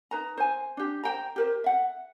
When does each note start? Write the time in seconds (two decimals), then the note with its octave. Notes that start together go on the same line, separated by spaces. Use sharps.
0.11 D#4 B4 A#5
0.37 C5 G#5
0.77 D4 G4
1.03 C5 G5 A#5
1.36 G4 A#4 C5
1.64 E5 F#5